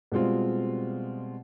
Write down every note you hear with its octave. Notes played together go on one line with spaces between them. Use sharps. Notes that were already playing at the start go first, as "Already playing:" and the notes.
B2 G3 G#3 C4 F4